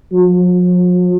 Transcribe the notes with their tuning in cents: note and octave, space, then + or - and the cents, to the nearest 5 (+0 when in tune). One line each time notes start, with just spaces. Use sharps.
F3 +45